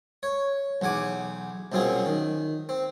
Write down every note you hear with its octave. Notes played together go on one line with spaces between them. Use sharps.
C#5
B1 E2 F#5 G#5 D6
C2 F#2 B2 C4 F4 G#4
D#3
C4